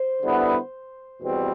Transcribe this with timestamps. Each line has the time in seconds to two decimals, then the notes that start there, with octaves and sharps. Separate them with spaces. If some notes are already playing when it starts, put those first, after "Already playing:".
Already playing: C5
0.22 D3 G3 B3 E4
1.21 E2 B2 G3 C4